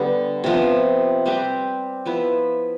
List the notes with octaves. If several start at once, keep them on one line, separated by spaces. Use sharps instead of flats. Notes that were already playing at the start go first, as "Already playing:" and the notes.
Already playing: D3 G3 B3
C3 F3 B3
G3 C4 G4 B4
F3 B3 E4 B4